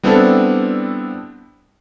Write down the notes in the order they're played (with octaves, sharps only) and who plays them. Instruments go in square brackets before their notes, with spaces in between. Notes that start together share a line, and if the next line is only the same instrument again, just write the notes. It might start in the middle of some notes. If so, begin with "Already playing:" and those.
[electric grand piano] G3 B3 C4 D4 E4 A4